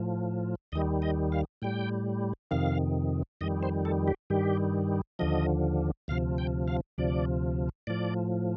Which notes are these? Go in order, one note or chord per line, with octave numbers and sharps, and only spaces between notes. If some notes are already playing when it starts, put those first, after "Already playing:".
Already playing: A2 F3
D#2 D#3 G3 D#5
D#5
F5
A2 G3 G5
F2 C3 D#3 F5
F2 D#3 G3 D#5
C5
A4
G4
G2 D#3 G3 G4
D#2 D3 F3 D#5
D2 C3 F3 F5
G5
F5
D2 C3 F3 D5
A2 F3 D5